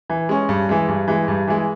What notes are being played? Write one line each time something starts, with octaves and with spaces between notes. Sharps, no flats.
E3
G#3 C#4
G2
E3 G#3
G2
E3 G#3
G2
E3 G#3